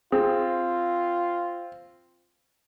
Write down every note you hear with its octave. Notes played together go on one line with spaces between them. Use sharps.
C4 F4 G#4